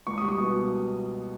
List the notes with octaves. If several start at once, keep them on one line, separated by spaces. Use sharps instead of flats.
C#2 C#6
G3 D#6
C#6
B2